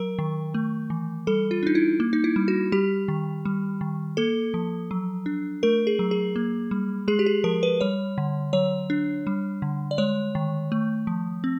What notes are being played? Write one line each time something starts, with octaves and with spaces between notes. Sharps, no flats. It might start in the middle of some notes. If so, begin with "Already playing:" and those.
Already playing: F#3 A#4
D#3
A3
E3
G3 A4
F4
D4 D#4
E4
A#3
D#4
E4
G3
F#4
G3 G4
D#3
G3
D#3
A#3 A4
F3
F#3
D4
A3 A#4
G#4
F#3
G#4
A#3
G3
G#3 G#4
G4
G#4
F3 A#4
B4
G3 C#5
D3
F#3 C#5
D4
G3
D3
D5
G#3 C#5
D#3
A3
F3
C4